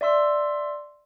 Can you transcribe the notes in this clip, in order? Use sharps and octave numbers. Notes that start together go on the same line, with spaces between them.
D5 E5 C6 E6